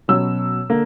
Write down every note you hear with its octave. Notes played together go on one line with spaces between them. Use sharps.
B2 F#3 C#4 E6
D3 A#3